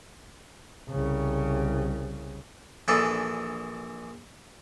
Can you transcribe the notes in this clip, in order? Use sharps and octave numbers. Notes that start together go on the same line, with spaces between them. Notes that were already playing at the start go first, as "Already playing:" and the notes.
C2 C#3
A#1 E3 D4 G#4 A4